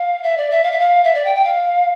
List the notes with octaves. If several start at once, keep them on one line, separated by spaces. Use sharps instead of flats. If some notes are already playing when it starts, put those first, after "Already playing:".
Already playing: F5
E5
D5
E5
F5
E5
F5
E5
D5
G5
G5
F5